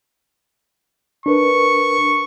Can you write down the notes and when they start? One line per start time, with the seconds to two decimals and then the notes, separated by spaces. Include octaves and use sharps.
1.26 D4 A#4 B4 C#6